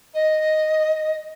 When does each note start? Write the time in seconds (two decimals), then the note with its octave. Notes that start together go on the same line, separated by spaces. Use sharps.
0.14 D#5